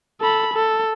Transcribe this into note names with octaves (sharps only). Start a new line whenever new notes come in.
A4 B5
A4